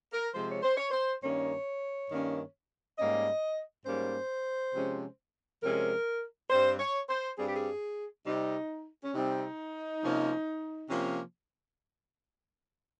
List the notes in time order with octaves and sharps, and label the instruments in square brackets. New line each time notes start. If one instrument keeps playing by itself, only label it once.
[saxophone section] A#4
C3 F3 G#3 C5
C#5
C5
C#5
C5
G2 D#3 A#3 C#4 C#5
G2 D#3 A#3 C#4
G#2 G3 A#3 C#4 D#5
G#2 G3 A#3 C#4 C5
C3 F3 G#3 C#4
C3 F3 G#3 C#4 A#4
G2 G3 C4 C5
C#5
C5
G2 G3 C4 G#4
G4
G#4
C3 G3 C4 D#4
C#4
C3 G3 C4 D#4
C3 F3 A#3 C#4
C3 F3 A#3 C#4